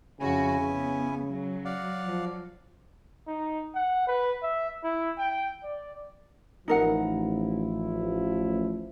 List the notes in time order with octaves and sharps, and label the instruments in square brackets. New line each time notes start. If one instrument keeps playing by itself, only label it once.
[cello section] F2 F#4 [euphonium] C#3 [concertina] C#4 E4 G#5
[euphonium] C#3 [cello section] B3
[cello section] F#3
[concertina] D5 F5 F#5
[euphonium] F3
[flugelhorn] D#4
F#5
B4
E5
E4
G5
D5
[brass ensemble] A1 F3 E4 [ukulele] D#4 A#4 F#5